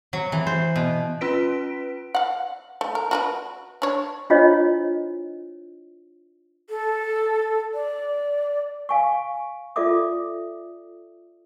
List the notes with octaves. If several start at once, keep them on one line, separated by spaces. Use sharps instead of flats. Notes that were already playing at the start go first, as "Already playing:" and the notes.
F#3
E3
C5
B2
C#4 F4 B4 B6 D7
F5 F#5
A3
A#4
F#4 A#4 B4
D4 C#5
D4 E4 F4 C5 C#5 D#5
A4
D5
F5 G#5 C#6
F4 A4 D5 E5 D6 D#6